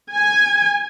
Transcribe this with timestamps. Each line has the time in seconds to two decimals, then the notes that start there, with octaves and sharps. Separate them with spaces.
0.12 G#5